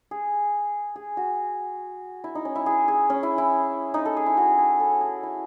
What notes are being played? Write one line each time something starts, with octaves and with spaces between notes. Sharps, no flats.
G#4
G#4
F#4
E4
D#4
C#4
E4
G#4
G#4
C#4
E4
E4
D#4
A4
G#4
E4
F#4
G#4
A4
G#4
E4